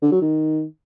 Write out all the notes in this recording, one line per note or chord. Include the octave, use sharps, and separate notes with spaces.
D3
F#3
D#3